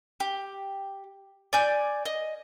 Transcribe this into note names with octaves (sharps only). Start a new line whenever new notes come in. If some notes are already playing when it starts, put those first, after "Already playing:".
G4
D5 G#5 G6
D#5